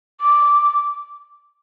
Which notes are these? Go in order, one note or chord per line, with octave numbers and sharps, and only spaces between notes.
D6